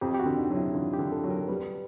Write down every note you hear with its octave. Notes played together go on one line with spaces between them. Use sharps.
F2 G4
G4
F#4
D3
D#4
F#3
E4
D3 F4
G4
D3
A4
F#3
A#4
G3 B4